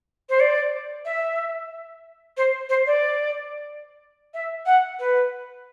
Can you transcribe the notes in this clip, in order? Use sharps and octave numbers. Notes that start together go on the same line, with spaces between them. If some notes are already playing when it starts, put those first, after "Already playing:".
C5
D5
E5
C5
C5
D5
E5
F#5
B4